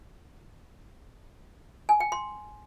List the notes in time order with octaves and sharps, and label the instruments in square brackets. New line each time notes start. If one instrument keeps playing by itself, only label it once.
[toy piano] G#5
G5
C6